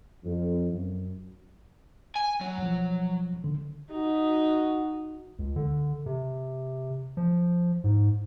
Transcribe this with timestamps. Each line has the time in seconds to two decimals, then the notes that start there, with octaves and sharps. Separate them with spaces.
0.24 F2
0.72 F#2
2.15 G#5
2.41 F#3
2.58 B1 F3
3.44 D3
3.92 D#4 F#4
5.39 C#2
5.56 D3
6.06 C3
7.17 F3
7.84 G#2